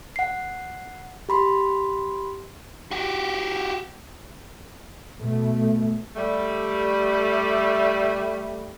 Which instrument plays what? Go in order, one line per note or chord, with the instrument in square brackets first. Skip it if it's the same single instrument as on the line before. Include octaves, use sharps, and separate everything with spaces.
[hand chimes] F#5 C7
G4 B5 C6
[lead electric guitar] F#4 G4
[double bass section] B2 A3
[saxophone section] G3 A3